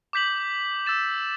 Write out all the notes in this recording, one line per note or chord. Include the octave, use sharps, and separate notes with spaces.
D6 G6 B6 F#7
E6 A6 E7